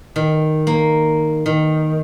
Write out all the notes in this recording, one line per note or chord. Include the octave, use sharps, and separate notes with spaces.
D#3
A#3
D#3